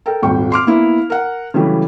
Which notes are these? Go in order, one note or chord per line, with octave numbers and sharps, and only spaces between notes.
A4 A#4 G5
D#1 G#1 G3 G5 C#6
C6 D6 F6
A#3 B3 E4
A#4 F#5
C#3 E3 F#3 G3 A3